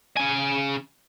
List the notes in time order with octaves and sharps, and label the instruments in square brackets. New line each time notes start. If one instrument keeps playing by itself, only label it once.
[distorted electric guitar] C#3 G#5